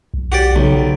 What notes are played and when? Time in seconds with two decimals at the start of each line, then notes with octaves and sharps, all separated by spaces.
0.14 B1
0.32 F#4 G4 D5
0.56 B1 C#3